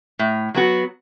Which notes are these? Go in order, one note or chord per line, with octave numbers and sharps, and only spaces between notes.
A2
F#3 B3 F#4